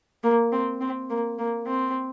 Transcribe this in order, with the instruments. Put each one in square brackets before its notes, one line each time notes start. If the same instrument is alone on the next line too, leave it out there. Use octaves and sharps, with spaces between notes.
[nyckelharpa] A#3
C4
C4
A#3
A#3
C4